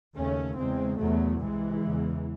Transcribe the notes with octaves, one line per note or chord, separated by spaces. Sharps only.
D#2 C#3 A3 C#4
E2 C#3 G#3 C4
E2 C3 F#3 A3
C2 C3 E3 G#3
E2 C#3